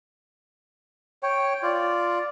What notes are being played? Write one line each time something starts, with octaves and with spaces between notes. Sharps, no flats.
C#5 G5
F4 D5